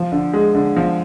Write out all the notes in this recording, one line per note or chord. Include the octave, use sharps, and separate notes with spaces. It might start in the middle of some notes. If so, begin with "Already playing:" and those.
Already playing: F3
D3
G#3
D3
F3